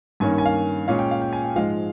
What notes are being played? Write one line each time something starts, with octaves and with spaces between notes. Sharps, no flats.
G2 D#3 A#3 C#4 G#5
G#5
F5
A#2 G#3 C#4 F5
G5
F5
G5
G#5
G5
G#2 F3 G#3 F5